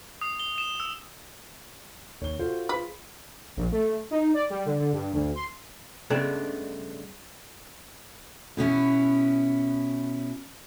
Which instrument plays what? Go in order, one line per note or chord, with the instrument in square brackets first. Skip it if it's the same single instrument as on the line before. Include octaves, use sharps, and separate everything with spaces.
[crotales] D#6
G7
E7
E6
[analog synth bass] D#2 [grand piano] C#5 G7
[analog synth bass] F4 [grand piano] F#4 A4 C5
[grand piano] G#4 C6 B6 [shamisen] B4
[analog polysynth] A#1
A3
D#4
D5
G3
D3
D3
G2
D2
C6
[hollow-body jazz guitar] G2 C#3 G#3 A3 B3 D4
[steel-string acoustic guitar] B2 B3 C#4 E4